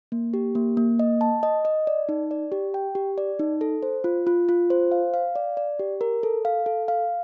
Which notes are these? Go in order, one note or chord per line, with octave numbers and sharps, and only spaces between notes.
A#3
G4
A#3
A#3
D#5
A5
D#5
D#5
D5
D#4
D5
G4
G5
G4
D5
D#4
A4
C5
F4
F4
F4
C5
F5
F5
D5
D5
G4
A#4
A4
F5
A4
F5